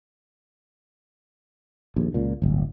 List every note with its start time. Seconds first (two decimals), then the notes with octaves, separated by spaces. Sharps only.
1.96 A#1 D#2
2.14 C#2 A#2
2.42 D1 G1